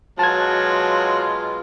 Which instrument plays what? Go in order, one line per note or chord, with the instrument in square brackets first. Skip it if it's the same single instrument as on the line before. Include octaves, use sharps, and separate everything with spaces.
[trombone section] B2 G#3 B3 [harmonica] F#3 [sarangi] F4 [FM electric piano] A5 G#6